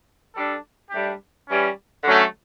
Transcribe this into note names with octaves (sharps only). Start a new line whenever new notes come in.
G3 D4 A4
A2 G3 D4 G4
E3 G3 C#4
D3 F#3 A3 C#4